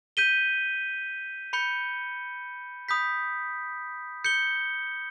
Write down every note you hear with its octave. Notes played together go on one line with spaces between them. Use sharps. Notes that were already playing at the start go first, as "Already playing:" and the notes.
G6 B6 D#7 G7
B5 G6 C#7 G7
B5 D#6 G6 B6
G6 C#7 G7